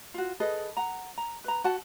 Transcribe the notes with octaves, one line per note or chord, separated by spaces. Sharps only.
F4 F#4
G#4 A4 B4 D#5
F#5 A#5
A#5
B4 A#5
F#4 F#5 A5